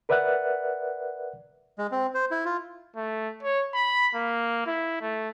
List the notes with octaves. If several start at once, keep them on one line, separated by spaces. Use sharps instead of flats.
A#4 B4 D5 E5 F#5 F#6
G#3
C4
C5
E4
F4
A3
C#5
B5
A#3
E4
A3